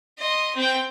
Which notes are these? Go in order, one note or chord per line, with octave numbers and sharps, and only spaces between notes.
D#5 C6
C4 G5